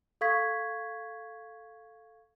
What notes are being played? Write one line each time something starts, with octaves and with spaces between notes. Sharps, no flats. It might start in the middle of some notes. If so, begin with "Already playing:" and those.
A4 F5 C#6 G#6 B6